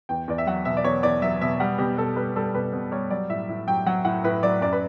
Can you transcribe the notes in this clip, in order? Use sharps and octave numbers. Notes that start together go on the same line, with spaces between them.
E2 G5
E2 D5
E5
F#3 F#5
B2 E5
D5
E2 C#5
E2 D5
F#3 E5
B2 E5
G3 F#5
B2 G4
B2 A4
G3 B4
G3 A4
B2 B4
B2
G3 C#5
F#3 D5
A2 E5
A2
F#3 G5
F#3 F#5
A2 F#5
A2 B4
F#3 D5
F#2 D5
B4